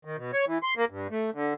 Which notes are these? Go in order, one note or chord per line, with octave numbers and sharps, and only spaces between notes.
D#3
B2
C#5
E3
C6
A#3
G2
A3
D3